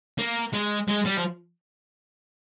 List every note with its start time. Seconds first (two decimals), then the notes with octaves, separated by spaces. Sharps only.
0.19 A#3
0.54 G#3
0.88 G#3
1.05 G3
1.17 F3